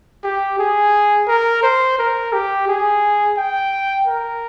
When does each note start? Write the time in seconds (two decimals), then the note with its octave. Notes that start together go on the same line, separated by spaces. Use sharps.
0.23 G4
0.59 G#4
1.28 A#4
1.63 C5
1.98 A#4
2.33 G4
2.68 G#4
3.37 G5
4.07 A#4